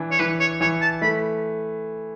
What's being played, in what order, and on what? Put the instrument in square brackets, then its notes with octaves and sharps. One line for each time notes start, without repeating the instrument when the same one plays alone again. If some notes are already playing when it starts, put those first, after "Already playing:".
Already playing: [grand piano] E3 D4
[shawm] C#5
[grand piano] E3 [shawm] B4
[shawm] C#5
[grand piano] E3 [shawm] C#5
[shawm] A5
[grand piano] A3 [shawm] B5